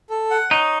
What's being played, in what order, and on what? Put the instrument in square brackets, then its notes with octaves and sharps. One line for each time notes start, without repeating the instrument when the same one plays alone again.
[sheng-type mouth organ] A4
F#5
[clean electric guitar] D#4 [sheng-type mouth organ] C#5